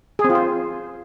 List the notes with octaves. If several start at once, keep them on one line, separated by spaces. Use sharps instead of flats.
G#4
C4
F4
C5